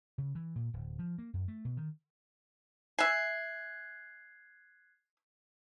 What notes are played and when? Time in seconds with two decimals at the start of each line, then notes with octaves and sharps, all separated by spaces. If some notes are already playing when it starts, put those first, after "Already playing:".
0.18 C#3
0.35 E3
0.56 A#2
0.73 D1
0.99 F3
1.18 A#3
1.34 F#2
1.48 A3
1.65 B2
1.77 D#3
2.99 E5 G#5 F#6 G#6 C7